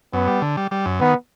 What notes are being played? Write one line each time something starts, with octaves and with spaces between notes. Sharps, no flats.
F#2 B3
G3
D3
G3
G3
F#2
D#3 B3